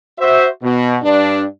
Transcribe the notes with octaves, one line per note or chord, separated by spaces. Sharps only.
F#4 C5 E5
B2
G2 D4